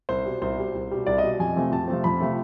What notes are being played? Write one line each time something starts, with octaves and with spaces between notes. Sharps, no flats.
C2 C5
B2 G3
C2 C5
B2 G3
C2
B2 G3
C2 D5
D#5
B2 G3
F2 G#5
C3 F3 A3 C4
F2 A5
C3 F3 A3 C4
F2 B5
C3 F3 A3 C4